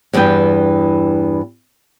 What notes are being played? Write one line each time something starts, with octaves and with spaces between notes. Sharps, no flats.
E2 G2 E3 B3 G5